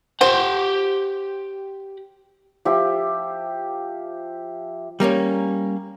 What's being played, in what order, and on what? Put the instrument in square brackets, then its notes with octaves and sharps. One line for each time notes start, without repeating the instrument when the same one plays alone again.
[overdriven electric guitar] G4 F#5 [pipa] C5
[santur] F3 G4 E5
[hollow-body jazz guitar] G3 A#3 C4 C#4